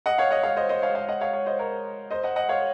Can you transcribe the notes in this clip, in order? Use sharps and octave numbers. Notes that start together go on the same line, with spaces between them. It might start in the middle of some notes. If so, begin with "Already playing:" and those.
D#5 F#5
C#5 F5
D#5 F#5
C#5 F5
C5 D#5
C5 D#5
C#5 F5
C#5 F5
D#5 F#5
C#5 F5
C#5 F5
C5 D#5
A#4 C#5
C5 D#5
D#5 F#5
D#5 F#5
C#5 F5